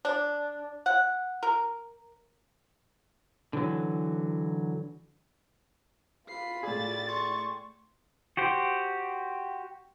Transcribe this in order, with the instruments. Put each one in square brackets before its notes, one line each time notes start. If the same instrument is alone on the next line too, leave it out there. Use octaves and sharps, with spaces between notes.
[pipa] D4
F#5
A#4
[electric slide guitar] D3 E3 F#3
[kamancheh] F4 B5 [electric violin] C7
[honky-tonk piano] A2 G#4 [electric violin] D5 A6
[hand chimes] C6 [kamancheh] C#6
[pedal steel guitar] F#4 G4 C5